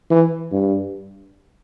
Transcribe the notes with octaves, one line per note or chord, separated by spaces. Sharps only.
E3
G2